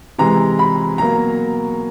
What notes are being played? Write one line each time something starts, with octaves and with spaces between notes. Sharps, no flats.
C3 E3 G#3 A#5
B5
B2 F#3 A#3 A#5